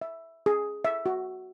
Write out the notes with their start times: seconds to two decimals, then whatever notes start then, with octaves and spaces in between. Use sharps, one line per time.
0.01 E5
0.46 G#4
0.85 E5
1.06 F#4